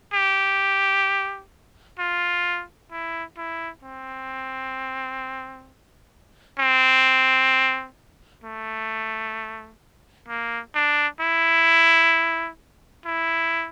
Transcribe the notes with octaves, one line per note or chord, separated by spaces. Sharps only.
G4
F4
E4
E4
C4
C4
A3
A#3
D4
E4
E4